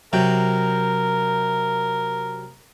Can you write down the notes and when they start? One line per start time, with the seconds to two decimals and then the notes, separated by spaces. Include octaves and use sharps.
0.13 C3 F#3 A#4 G5